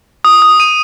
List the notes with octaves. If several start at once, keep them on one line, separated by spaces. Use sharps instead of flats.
D#6
D#6
D#7